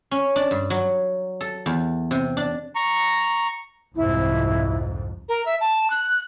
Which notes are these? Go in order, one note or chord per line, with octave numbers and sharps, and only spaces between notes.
C#4
D4
G2
F#3
A4
E2
C3
D4
A#5 C#6
C2 F2 G#2 E4
A#4
E5
A5
F#6